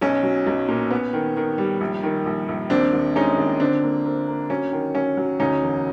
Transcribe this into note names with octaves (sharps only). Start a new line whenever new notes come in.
B1 C#4
F#3
B1
A#2
B3
D#3
D#3
G3
A#1
D#3
A#1
A#1
D#2 C4 D4
D#2
G#3 C#4 D#4
D#2
D3 C4 D4
A#3
A#3 C4
A#3
F#3 C#4
D#3
F#3 C#4
F#3
D2 C#4 D#4
E1